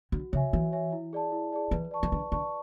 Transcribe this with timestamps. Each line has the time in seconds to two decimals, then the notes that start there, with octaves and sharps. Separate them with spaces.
0.12 D3 F#4
0.33 C#3 C#5 E5 G#5
0.52 E3 F#4
0.72 C#5 E5 G#5
0.92 E4
1.13 G#4 D5 A5
1.32 E4
1.53 G#4 D5 A5
1.71 E3 B4
1.91 D5 A5 C#6
2.03 E3
2.12 D3 B4
2.31 D3 D5 A5 C#6